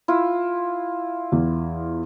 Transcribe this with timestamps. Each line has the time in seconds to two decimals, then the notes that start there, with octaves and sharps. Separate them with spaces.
0.08 E4 F4
1.32 E2